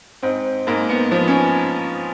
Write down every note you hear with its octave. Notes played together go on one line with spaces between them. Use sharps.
G#2 C4
G#2 A#3
B3
F3 B3
C#4